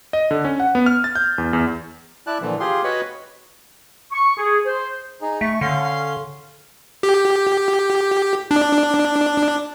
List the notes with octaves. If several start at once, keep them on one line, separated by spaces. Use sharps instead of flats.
D#5
D3
C#4
F#5
B3
F6
A6
G6
E2
E2
E4 D5 A5 F#6
A#2 D3 E3 F3
F4 G4 G#4 C6
F#4 B4 C#5 D#5 F#5 B5
C#6
G#4
C5
D#4 G#4
A3 C#6
D3 C#4 F5 C6
G4
D4